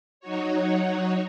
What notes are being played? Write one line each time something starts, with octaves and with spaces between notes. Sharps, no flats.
F#3 D#4 F#4 C#5